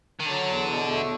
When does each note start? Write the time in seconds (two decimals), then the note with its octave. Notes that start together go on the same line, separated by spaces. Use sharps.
0.20 D#3
0.26 D3 F#3
0.48 E2
0.68 B2
0.89 A3